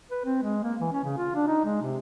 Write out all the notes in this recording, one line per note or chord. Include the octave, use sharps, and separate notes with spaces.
B4
C4
G#3
A#3
E3
C#4
C#3
F4
D4
D#4
G#3
C3